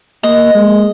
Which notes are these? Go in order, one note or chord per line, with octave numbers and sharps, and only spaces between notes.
A#3 D#5
G#3